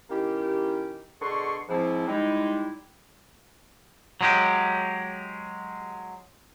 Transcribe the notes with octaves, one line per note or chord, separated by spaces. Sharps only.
D#3 A#3 C#4 E4 G4
B2 D3 G#4 D5 C6 C#6
G#2 F3 C4 E4
G3 G#3 D#4 E4
F#3 G#3 G4